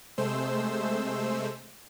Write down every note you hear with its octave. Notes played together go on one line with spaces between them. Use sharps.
C3 G#3 A3 C5 E6